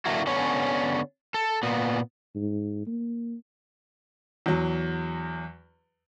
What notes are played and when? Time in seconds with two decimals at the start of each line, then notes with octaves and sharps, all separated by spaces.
0.05 D3 F#3 A3 A#3 E4 F#4
0.27 D3 B3 C#4 C#5
1.34 A4
1.63 A#2 B3
2.36 G#2
2.87 A#3
4.46 E2 F#3